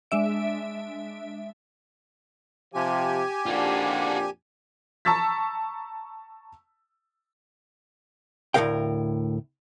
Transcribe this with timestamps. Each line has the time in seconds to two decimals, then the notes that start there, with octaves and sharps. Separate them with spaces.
0.11 G#3 D4 E5 D7
2.74 C3 F3 G4 G#5
3.46 F2 A#2 D4 F4 F#4
5.05 A5 A#5 C#6 E6 A6 B6
8.54 D2 A2 C3 A#4 F5 G5